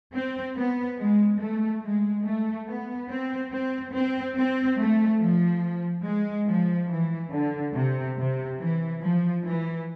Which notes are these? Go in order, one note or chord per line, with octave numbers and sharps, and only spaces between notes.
C4
B3
G#3
A3
G#3
A3
B3
C4
C4
C4
C4
A3
F3
G#3
F3
E3
D3
C3
C3
E3
F3
E3